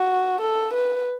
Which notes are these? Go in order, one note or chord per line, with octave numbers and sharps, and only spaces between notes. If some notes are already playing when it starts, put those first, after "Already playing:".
Already playing: F#4
A4
B4